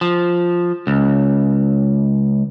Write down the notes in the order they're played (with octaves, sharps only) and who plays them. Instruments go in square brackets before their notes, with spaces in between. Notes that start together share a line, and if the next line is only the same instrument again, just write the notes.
[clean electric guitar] F3
C#2